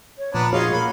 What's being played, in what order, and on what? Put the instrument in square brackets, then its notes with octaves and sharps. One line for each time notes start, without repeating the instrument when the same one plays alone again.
[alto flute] C#5
[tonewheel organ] A#2 F3 [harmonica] B3 D4 [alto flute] A#5
[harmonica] D#4 F4 F5 [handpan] F#4 C#5 [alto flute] G#4
[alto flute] A#3 [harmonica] B5